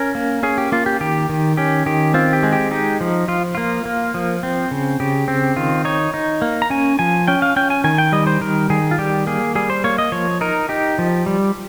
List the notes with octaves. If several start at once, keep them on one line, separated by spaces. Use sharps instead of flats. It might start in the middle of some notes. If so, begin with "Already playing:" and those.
Already playing: C#4 A#4
A#3
C#4 G#4
G4
A#3 F4
G4
D#3 G4
D#3
C#4 G4
D#3 G4
C4 F4
G4
G#3
G4
D#4 G4
F3
F3 F4
A#3 F4
A#3
F3
C4
C#3
C#3 G4
C4
D#3 F4
D#4 C#5
D#4
A#3
A#5
C#4 G#5
F3 G#5
C#4 G5
F5
C#4 G5
G#5
D#3 G#5
G5
G3 D#5
C5
D#3 A#4
D#3 G#4
F4
G3 G4
A#3 G#4
G3 G#4
C5
A#3 C#5
D#5
F3 C#5
D#4 A#4
D#4 G4
F3
G3